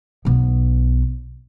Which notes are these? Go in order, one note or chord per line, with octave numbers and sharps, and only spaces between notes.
B1 B3